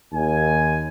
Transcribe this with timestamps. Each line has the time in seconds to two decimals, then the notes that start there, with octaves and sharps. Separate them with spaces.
0.13 D#2 G#5